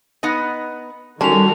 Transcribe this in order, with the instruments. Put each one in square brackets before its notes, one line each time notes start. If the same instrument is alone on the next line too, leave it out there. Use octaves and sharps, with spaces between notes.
[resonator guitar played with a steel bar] B3 D#4 D#5
[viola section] D#3 F#4 A4 [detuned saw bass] G3 [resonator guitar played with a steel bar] G#3 C#4 [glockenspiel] A5 F7